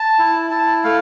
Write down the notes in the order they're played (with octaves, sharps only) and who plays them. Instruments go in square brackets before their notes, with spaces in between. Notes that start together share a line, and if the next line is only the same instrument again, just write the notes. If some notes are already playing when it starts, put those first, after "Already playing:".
Already playing: [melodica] A5
E4
E4 A5
A3 F5